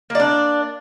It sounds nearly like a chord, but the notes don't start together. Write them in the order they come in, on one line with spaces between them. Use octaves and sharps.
A#3 D5 D4